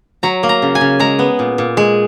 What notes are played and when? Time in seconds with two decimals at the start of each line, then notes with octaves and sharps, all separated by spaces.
0.23 F#3 A#5
0.43 A#3
0.49 A#5
0.62 C#3
0.75 G#5
0.81 C#3
0.99 G#3 A#5
1.19 B3
1.39 A#2
1.58 A#2
1.77 G#3